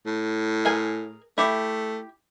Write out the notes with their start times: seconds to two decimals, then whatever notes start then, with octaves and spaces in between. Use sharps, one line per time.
0.06 A2
0.65 G#4 A#4 G#5
1.38 A3 E4 G4